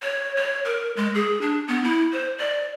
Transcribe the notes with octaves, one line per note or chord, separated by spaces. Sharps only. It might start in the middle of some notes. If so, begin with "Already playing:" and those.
C#5
C#5
A#4
G#3
G#4
D4
B3
E4
C5
D5